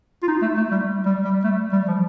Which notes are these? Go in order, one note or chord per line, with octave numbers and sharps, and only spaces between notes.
F4
D#4
A3
A3
G3
G3
G3
A3
G3
F3